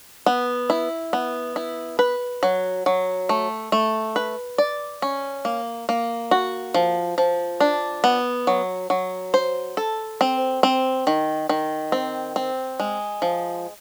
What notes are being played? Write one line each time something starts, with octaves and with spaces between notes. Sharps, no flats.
B3
E4
B3
E4
B4
F#3
F#3
A3
A3
B4
D5
C#4
A#3
A#3
F#4
F3
F3
D4
B3
F#3
F#3
C5
A4
C4
C4
D#3
D#3
C4
C4
G#3
F3